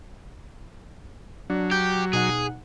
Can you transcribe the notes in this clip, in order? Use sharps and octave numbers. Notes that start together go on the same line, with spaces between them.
F#3 D4
G4 G6
B2 D#4 G#4 F#5